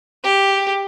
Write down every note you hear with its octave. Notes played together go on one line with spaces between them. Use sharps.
G4